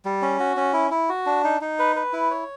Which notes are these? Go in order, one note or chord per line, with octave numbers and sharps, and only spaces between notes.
G3
C#4
F#4
C#4
E4
E4
F#4
D4
D#4
D#4
B4
B4
E4
C#5